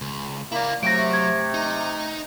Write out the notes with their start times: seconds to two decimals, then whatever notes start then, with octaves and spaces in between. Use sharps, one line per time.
0.01 C#2
0.52 A#3 E4 D5
0.83 C3 F#3 A3 A#6 D7
1.13 G#6
1.54 D#4